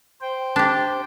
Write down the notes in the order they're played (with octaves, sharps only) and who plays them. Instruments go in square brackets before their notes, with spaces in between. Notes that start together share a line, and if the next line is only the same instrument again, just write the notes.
[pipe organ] C5 G5
[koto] D4 G4